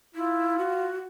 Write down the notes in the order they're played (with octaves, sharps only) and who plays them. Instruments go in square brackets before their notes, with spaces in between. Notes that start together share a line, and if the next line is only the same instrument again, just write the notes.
[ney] E4 [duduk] F4
[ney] F#4